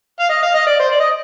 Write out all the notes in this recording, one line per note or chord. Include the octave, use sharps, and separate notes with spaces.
F5
D#5
F5
D#5
D5
C5
D5
D#5